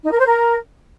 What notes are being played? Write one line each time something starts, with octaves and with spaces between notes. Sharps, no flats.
D#4
A#4
C5
A#4